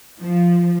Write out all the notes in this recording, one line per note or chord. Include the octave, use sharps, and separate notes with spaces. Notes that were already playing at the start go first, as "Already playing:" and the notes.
F3